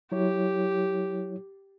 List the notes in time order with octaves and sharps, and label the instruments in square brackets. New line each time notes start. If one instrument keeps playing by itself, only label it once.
[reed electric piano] F#3 E4 C#5 [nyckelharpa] G4